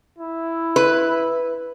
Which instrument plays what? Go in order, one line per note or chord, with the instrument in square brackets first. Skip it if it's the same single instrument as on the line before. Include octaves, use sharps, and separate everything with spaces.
[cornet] E4
[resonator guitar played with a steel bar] B4